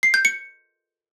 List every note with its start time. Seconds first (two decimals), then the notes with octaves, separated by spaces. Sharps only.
0.03 C7
0.14 G6
0.25 C#7